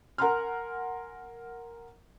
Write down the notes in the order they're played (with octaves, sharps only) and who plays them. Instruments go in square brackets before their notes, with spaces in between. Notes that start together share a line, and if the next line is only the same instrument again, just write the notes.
[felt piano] A#4 F#5 G#5 A#5 C6 F6